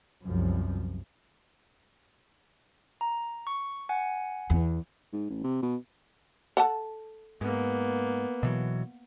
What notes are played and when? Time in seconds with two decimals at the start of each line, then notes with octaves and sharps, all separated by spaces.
0.24 C2 F#2 F3
3.01 A#5
3.47 C#6
3.89 F#5 G#5
4.50 E2
5.12 G#2
5.30 A1
5.44 C3
5.62 B2
6.57 A4 F#5 A5
7.41 G#2 A#3 B3
8.43 B2 E3 F#3